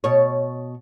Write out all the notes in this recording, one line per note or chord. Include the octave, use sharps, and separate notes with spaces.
B2 C#5